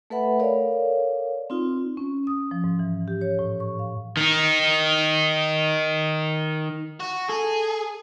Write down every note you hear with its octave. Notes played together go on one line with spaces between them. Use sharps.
A3 A4 B4 E5 F#5 B5
A4 A#4 C#5 D5 F5
C4 D#4 F4
C#4
D#6
F3
G#2
E3
G4
C#5
A2
C#6
F5
D#3 D#4
F#4
G#4 A4